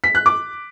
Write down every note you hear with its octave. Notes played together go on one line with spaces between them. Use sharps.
B6
F#6
D6